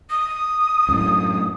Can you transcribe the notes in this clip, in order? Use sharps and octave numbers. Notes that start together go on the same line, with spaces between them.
D#6
F#2 A2